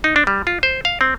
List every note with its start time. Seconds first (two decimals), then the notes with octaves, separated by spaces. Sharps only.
0.04 D#4
0.16 D4
0.27 G3
0.47 F4
0.63 C5
0.85 F5
1.01 C4